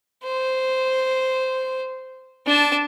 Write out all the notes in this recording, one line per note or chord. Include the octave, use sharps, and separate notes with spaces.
C5
D4 A5